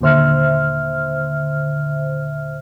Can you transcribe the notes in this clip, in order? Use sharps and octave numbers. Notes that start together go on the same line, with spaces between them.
D#2 A#2 D3 C5 E5 F6